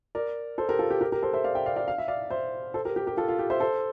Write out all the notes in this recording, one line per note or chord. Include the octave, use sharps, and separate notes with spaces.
A#4 D5
A4 C5
G4 A#4
F4 A4
G4
G4 A#4
G4 A#4
A4 C5
C5 E5
D5 F5
E5 G5
D5 F5
D5 F5
F5
E5
D5 F5
C5 E5
A4 C5
G4 A#4
G4 A#4
G4 A#4
F4 A4
F4
G4
C5 E5
A4 C5